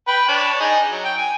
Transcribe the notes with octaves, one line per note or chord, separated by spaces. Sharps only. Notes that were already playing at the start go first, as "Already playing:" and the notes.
B4 G5
D4 C#5
D#4 G#4
F#3
G5
G#5